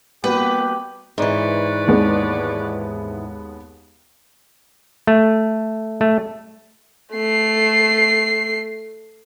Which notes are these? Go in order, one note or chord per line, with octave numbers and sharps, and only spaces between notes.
G3 A#3 B3 F#4 G4 B4
G#2 E3 B4 C#5 D5
D#2 G#3 B3
A3
A3
A3 C7